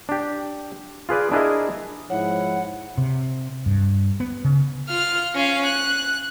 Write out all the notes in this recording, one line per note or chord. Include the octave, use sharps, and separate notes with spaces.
D4 G4
F4 G#4 B4 D5
D4 E4 G#4 A#4 D#5 E5
G#2 F3 E4 C#5 F#5
C3
G2
B3
C#3
F4 F6
C#4 F5
F#6